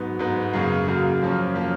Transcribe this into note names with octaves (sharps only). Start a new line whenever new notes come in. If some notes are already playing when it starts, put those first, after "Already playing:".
Already playing: G#2 F#3 B3 D#4
G#2 F#3 B3 D#4
F#2 C#3 F#3 A#3
F#2 C#3 F#3 A#3
F#2 F3 A#3 C#4
F3 A#3 C#4